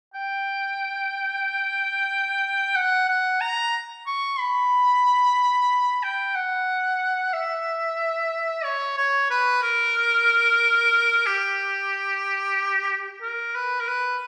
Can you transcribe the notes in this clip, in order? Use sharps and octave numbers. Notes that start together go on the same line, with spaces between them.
G5
F#5
F#5
A#5
C#6
B5
G5
F#5
E5
C#5
C#5
B4
A#4
G4
A#4
B4
A#4
B4